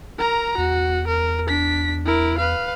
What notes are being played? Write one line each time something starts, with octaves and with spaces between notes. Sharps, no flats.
A#4 A#5
E2 F#4
A#4
D4 B6
E4 A#4
B4 F5